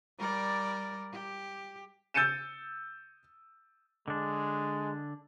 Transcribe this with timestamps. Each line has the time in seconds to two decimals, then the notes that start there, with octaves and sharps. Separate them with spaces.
0.19 G3 A#4 D5
1.13 G4
2.14 E6 G6 A6 C#7 D#7 E7
4.08 D3 G#3 D4